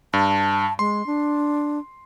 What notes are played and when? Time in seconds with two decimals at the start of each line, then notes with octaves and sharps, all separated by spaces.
0.13 G2 A5
0.79 G#3 C6
1.06 D4